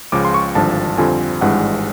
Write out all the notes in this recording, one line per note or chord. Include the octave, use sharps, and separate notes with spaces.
C#2 C#3 F3 D6
C6
C#6
G#1 G2 D3 F3 A5
F2 D3 G3 C4 F4 G#5
G#1 G2 E3 G#3 F#5